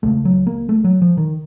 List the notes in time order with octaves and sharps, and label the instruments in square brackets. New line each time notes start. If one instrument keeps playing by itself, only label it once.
[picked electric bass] C#2 C#3 A3
F#3
A#3
A3
F#3
F3
D#3